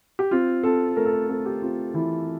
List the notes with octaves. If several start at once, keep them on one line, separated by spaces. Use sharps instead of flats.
G4
C4 F4
C4 A4
A3 A#4
A4
A#4
C4 A4
G4
C4 F4
E3 E4